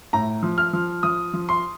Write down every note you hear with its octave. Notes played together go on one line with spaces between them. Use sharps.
A2 A#5
F3
F6
F3
F3 D#6
F3
C6